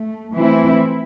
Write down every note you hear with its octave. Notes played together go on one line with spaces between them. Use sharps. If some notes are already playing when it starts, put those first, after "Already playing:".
Already playing: A3
E3 A3 C4 E4